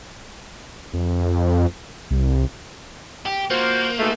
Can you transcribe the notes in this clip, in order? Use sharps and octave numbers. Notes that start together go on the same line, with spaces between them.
F2
C2
G4
A#3 F4 F#4 C5
G#2 B2 A3